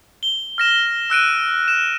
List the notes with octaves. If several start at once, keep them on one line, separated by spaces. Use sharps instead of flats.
G7
F6 A#6 E7
E6 F#6 D7 D#7
E7